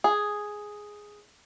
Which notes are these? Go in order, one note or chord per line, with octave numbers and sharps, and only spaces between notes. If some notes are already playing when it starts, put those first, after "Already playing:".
G#4